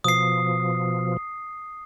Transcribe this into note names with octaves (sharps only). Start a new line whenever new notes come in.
B2 F3 D#6 C7